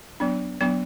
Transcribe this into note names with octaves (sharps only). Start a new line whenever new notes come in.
F#3 B3 D4
F#3 B3 D4